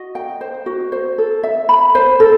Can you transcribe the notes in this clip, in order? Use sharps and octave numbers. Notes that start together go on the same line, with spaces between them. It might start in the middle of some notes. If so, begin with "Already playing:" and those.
Already playing: F#4 D#5
G5
C5
F#4
C5
A4
E5
B5
C5
A4